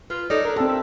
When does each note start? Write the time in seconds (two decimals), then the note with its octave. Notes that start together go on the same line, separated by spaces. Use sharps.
0.10 F4 B4
0.30 D#4 A4 C#5 D5
0.45 D4 A#4
0.56 C4 G4 A4
0.69 E5